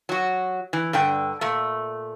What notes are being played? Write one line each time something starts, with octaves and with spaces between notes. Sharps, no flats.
F#3 F#4
E3
G2 D3 G5
A#2 A3